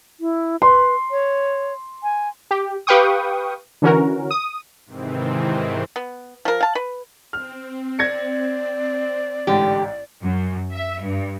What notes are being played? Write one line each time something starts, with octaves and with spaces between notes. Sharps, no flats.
E4
B4 C6
C#5
G#5
G4
G4 B4 F5 G5 C#6 D#6
D3 E3 C#4 F#4 A#4
D#6
G#2 C3 D#3 E3 C4
B3
F3 A#4
F5 A5
B4
C4 F6
D5 G#6 A#6 C#7
A1 G#2 D3 G4
F#2
E5
G2